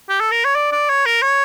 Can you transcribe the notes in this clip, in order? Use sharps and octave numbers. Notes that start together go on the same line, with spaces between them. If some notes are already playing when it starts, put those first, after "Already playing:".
G4
A4
A#4
C#5
D5
D5
C#5
A#4
C#5